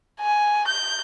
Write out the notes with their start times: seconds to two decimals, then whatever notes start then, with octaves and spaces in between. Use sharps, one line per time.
0.20 G#5
0.67 G6